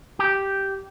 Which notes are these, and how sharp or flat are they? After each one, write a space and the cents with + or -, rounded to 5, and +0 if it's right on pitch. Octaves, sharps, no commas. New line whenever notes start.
G4 -5